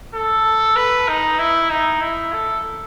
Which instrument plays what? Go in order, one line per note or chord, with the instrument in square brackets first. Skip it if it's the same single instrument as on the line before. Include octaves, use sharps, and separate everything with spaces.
[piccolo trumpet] A4
B4
D#4
E4
D#4
E4
A4